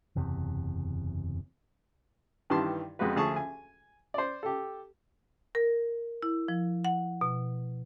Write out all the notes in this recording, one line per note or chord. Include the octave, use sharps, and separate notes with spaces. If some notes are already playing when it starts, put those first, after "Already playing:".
F#1 E2 C3
G2 D#3 E3 G4 A5 C6
F2 G#3 B3 F#4 B4
D2 F3 G#4 A5 C#6
G#5
C5 D5
G4 A4
A#4
E4
F3
F#5
B2